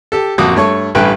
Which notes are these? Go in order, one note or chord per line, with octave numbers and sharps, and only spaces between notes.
G4 A4
A1 F2 A#3 F#4 D6 D#6
G2 A3 C#5 C#6
A1 G2 A3 B4 G5 G#5